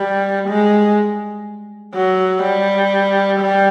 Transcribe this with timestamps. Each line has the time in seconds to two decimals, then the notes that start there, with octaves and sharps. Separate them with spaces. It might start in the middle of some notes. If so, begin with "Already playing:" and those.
Already playing: G3
0.48 G#3
1.94 F#3
2.43 G3
3.40 G3